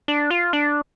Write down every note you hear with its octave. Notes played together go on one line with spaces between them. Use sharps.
D4
F4
D4